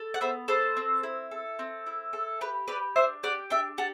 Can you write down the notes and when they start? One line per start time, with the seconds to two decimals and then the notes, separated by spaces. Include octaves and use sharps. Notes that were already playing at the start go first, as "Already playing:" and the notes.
Already playing: A4
0.14 F#5
0.21 B3 C5 E5
0.48 B3 A4 C5
0.77 C4
1.03 E4
1.31 A4
1.59 C4
1.86 E4
2.13 A4
2.41 G4 B4
2.68 G4 B4 D5
2.96 D4 C5 E5
3.23 G4 D5 F#5
3.50 D4 E5 G5
3.78 G4 F#5 A5